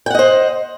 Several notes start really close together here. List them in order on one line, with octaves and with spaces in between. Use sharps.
G5 F#5 D#5 C5